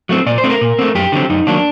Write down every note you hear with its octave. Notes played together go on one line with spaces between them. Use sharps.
F#3 A3 C4
A#2 D5
C5
A3 C4
A#4
A#2
A3 C4
F#2 G4
D3 F#3 C4
F#2 D#4
D#3 F#3 A#3 D4